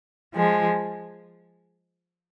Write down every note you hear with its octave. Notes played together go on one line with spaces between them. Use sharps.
F3 G#3